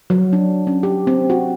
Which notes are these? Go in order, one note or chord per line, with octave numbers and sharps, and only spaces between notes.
F#3
D4
C#4
G4
C4
F#4